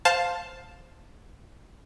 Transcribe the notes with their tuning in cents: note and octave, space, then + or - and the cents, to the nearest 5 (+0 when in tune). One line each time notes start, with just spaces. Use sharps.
C5 +0 F5 +10 A5 +0